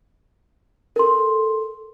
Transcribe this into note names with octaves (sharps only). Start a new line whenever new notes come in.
A4 A#4 C6